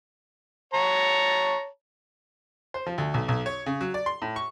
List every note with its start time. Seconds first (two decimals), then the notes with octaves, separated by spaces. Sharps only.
0.74 C#5 A5 A#5
2.74 C5
2.87 F3
2.98 D2
3.14 B1
3.28 B1
3.46 C#5
3.66 C#3
3.81 F#3
3.94 D5
4.06 C6
4.22 A2
4.36 C#6